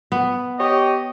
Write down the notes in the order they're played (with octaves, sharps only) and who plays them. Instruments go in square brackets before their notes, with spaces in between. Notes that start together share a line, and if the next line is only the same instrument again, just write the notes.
[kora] B3
[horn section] G4 C#5 D#5